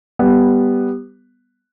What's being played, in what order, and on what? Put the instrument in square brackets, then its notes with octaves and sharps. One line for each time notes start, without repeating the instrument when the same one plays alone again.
[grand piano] G3 B3